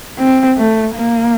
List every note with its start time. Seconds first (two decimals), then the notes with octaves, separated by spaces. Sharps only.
0.19 C4
0.57 A3
0.95 A#3